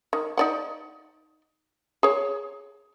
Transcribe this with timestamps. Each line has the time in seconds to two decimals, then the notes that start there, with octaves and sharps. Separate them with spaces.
0.13 D#3
0.37 D#4 D5 F#5
2.03 G#4 C#5